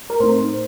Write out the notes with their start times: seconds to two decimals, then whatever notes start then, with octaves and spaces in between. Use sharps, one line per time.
0.10 A#4
0.20 A2 A3 C4 D#4 C5